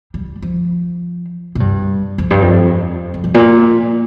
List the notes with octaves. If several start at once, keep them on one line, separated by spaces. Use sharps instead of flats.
G3
F3
A#2
G2
F2
G2
F2
F2
G2
A#2